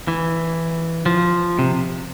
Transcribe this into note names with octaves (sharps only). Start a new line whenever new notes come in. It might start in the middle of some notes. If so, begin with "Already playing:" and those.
E3
F3
C3